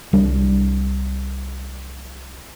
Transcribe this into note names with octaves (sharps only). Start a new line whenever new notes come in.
C2 G3 D4